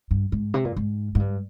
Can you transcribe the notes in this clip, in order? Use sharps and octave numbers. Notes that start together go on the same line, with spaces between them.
G2
G#2
C3
A#2
G#2
G#2
G2